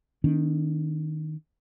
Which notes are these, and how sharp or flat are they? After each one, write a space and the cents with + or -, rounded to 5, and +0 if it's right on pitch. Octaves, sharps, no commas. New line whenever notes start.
D#3 +0 B3 -15 D4 -40